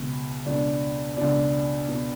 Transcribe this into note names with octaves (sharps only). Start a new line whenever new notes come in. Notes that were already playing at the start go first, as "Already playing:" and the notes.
Already playing: C#2 B2
C#2 B2 D4
C#2 B2 D4
B2